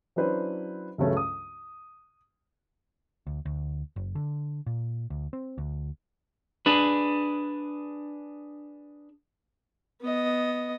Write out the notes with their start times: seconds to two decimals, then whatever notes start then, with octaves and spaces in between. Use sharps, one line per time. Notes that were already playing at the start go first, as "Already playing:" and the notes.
0.16 F#3 C#4 D4 E4 B4 C5
0.98 C#2 G2 C#3 F#3 A3 C#4
1.17 D#6
3.27 D2
3.45 D2
3.96 F#1
4.15 D3
4.66 A#2
5.10 D2
5.33 C4
5.58 D2
6.66 D4 G#4 B4
10.01 B3 D#5